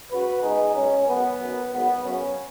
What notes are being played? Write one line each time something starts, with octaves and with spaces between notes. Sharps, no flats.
C#2 C#3 F#3 F#4 B4
C#2 B2 G#3 D#4 G#4
C#2 B2 F#3 C#4
G#1 F#2 F#3 B3
F#2 D#3 F#3
G#1 G#2 F#3 B3
F#2 C#3 F#3 C#4